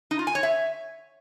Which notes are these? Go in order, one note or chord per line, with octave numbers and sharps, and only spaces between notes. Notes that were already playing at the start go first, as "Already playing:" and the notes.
D#4
F4
G#5
C#5
E5